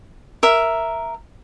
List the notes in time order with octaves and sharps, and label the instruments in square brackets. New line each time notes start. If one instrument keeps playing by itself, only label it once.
[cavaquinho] A#4 E5